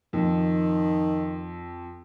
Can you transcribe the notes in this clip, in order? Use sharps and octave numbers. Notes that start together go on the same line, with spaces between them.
F2 D#3